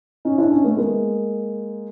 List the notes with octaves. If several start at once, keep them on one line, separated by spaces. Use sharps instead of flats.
C#4 D#4
D4 E4
C#4 D#4
A3 B3
G#3 A#3